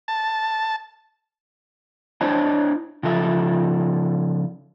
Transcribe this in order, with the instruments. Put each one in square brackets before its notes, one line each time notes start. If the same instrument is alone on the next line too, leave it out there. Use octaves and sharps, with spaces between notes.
[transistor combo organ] A5
[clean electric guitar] D4 E4 C5 C#5 D#5 A5
C#3 F3 A4 E5